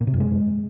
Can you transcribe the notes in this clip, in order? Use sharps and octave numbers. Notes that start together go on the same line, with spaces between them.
A#2
C3
F#2
G#3